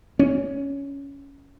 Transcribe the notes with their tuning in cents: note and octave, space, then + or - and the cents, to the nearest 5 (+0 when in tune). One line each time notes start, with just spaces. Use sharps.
C#4 +10